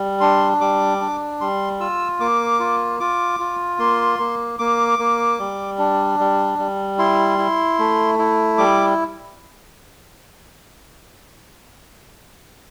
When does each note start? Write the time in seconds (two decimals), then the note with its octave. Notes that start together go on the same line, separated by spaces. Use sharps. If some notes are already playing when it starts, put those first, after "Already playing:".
Already playing: G3
0.20 D4 C6
0.61 G3 D6
1.01 D4
1.41 G3 C6
1.80 F4 E6
2.20 A#3 D6
2.59 F4
3.00 F4 D6
3.40 F4
3.79 A#3 C6
4.19 A#3
4.59 A#3 D6
4.99 A#3
5.39 G3
5.79 D4
6.19 G3
6.59 G3
6.98 E4 C6
7.38 E4
7.79 A3
8.19 E4
8.58 G3 D6